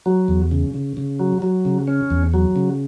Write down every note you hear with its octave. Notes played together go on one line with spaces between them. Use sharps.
F#3
E2
C#3
C#3
C#3
F#3
F#3
C#3
C#4
E2
F#3
C#3